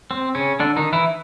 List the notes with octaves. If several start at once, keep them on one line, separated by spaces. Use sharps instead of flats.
C4
C#3 C#4
D3 D4
D#3 D#4
E3 E4